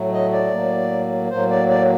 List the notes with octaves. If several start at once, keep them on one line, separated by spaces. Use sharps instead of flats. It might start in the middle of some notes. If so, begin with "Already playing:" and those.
Already playing: A2 F#3 A3
D#5
D5
A2 F#3 A#3
A2 F#3 A#3 C5
D5
D5